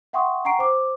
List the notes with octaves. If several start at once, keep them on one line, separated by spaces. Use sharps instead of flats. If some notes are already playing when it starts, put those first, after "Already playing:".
E5 F#5 G5 C6 C#6 D#6
F#5 G5 A#5 C#6 C7 D7
C5 D6